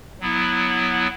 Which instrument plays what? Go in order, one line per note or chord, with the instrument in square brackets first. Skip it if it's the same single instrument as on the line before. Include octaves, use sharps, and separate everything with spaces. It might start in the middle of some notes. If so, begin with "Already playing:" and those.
[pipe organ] F#3 B3 E4